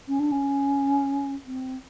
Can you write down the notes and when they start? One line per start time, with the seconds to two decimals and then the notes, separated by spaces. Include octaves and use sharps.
0.08 C#4
0.20 D4
0.32 C#4
1.46 C4